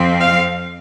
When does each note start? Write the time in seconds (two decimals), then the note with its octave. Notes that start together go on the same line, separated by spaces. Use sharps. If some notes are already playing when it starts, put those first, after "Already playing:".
Already playing: F2 F3 C4
0.22 F5